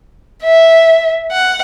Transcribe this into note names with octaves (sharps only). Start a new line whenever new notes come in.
E5
F#5